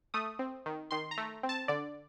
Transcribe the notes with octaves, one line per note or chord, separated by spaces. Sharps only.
A3 D#6
C4
D#3
D#3 C6
A#5
A3
C4
A5
D3 D5